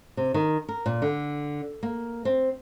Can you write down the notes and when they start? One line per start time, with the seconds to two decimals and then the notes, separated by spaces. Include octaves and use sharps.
0.17 C3
0.34 D#3
0.69 A#4
0.86 A#2
1.02 D3
1.83 A#3
2.25 C4